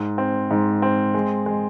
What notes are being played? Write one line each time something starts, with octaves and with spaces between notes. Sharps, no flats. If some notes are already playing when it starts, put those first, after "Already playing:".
Already playing: G#2
C4
G#2
C4
G#3
G#3